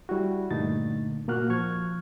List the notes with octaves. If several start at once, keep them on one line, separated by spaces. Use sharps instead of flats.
G3 E4 F#4
G2 A#2 D3 A3 D#4 A6
A#2 A#3 F#4 F6 F#6
F3 C#6 F6 G#6